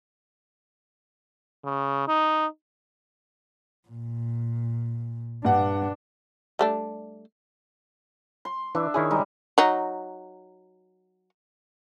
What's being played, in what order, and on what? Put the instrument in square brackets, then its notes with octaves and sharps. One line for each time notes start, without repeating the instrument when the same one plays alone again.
[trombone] C#3
D#4
[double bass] A#2
[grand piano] G2 F#5 [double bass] D4
[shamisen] G3 A3 D4
[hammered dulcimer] C6
[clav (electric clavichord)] E3 [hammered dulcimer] D4 E5
[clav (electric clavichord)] D#3 E4 G#4 [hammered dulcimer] C#5
[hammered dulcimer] G3 G#3 D#4
[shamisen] F#3 D#4